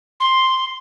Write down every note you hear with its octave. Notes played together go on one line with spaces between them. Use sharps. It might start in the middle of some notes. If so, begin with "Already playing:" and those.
C6